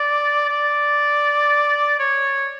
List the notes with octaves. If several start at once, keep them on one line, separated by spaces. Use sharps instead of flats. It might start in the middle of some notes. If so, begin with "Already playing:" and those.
Already playing: D5
D5
C#5